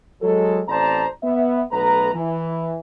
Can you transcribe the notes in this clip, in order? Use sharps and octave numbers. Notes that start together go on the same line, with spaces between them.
F#3 G#3 A4
A1 C4 C5 D5 A5 A#5
B3 E5
B1 A3 B3 B4 A#5
E3